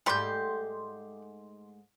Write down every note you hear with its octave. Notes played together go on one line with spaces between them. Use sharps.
G#2 G3 A3 G4 C6 C#6 G6